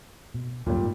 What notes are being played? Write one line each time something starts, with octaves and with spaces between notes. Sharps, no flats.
B2
D1 F#2 A#2 G3
G#2